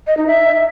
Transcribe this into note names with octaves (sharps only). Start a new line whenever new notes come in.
D#5
D#4
E5